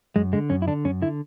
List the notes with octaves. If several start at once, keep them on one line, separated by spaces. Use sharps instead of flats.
F#2 G#3
D3 G#3
F#2 C#4
E4
D3 D4
F#2 C#4
D3 E4